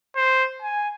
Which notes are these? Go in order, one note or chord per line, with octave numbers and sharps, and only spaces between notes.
C5
G#5